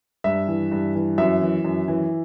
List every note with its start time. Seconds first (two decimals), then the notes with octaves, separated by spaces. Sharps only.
0.24 G2 E5
0.48 E3
0.72 G2
0.95 E3
1.18 F#2 E5
1.42 E3
1.64 F#2
1.88 E3